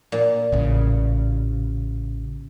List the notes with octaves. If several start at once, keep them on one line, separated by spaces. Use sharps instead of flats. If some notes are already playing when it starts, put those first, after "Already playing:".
A#2 A#3
A1 C#3